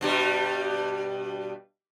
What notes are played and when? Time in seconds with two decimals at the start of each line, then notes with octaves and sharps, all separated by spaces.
0.01 G2 B2 G3